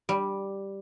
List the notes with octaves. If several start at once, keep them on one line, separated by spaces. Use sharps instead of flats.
G3